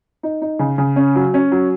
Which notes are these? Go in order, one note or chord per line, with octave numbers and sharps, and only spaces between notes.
D#4
D#4
C#3
C#3
C#4
F#3
C#4
F#3